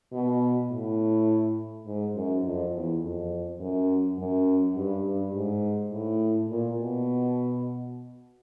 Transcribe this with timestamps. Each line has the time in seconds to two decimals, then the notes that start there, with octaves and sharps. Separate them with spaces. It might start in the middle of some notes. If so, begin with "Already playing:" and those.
0.13 B2
0.71 A2
1.86 G#2
2.15 F#2
2.44 F2
2.73 E2
3.02 F2
3.60 F#2
4.18 F#2
4.76 G2
5.05 G2
5.34 G#2
5.92 A2
6.49 A#2
6.78 B2